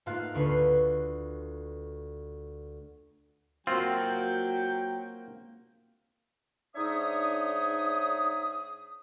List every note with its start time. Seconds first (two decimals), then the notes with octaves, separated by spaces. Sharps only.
0.06 G#2 A3 A#3 F4 F5 F#6
0.34 D2 D3 B4 C#6 C7
3.67 F#3 A#3 C4 F4 F#4 G5
6.75 G#2 D4 D#4 C#5 E5 D#6